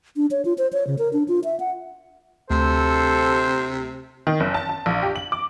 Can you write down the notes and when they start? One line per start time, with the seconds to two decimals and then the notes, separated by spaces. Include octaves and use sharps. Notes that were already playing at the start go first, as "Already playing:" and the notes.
0.16 D4
0.31 C#5
0.45 F4
0.58 C5
0.73 C#5
0.87 C#3
0.99 A#4
1.13 D4
1.28 F4
1.44 E5
1.60 F#5
2.50 D2 C3 A4 C5
4.27 D#3
4.40 F#1
4.54 A5
4.69 A5
4.86 A#1
5.03 G4
5.16 F#7
5.32 D6